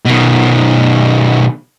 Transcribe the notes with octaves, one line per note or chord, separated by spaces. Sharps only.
B2 D#3